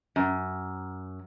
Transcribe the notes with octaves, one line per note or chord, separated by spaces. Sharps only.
F#2